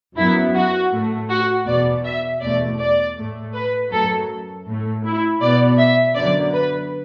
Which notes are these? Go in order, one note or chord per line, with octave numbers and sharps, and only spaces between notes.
F#2 F#3 B3 E4
F#4
A2 A3
F#4
E2 B2 B3 D5
E5
E2 B2 A3 D5
D5
A2 A3
B4
F#2 F#3 A3 A4
A2 A3
E4
B2 B3 D5
E5
F#2 D3 F#3 B3 D5
B4